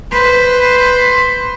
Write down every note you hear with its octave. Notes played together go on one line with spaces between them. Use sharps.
B4 C5